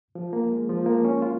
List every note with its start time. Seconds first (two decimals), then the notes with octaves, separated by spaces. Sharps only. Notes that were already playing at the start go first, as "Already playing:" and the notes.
0.15 F3
0.33 A#3
0.51 G#3
0.69 F3
0.86 A#3
1.05 C#4
1.22 F4